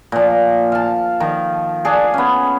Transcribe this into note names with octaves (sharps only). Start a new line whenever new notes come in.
A#2 F3
F5 A5
D#3 F3
D4 G#4
B3 C#4